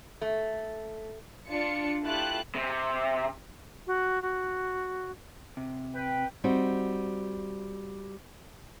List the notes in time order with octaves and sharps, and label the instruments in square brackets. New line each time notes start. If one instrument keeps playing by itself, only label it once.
[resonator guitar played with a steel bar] A3
[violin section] D4 F4 C#7
A3 E4 F4 G4 A5 F#6
[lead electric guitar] C3
[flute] F#4
F#4
[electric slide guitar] C3
[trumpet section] B4 G5
[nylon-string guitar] G3 C4 D#4 F#4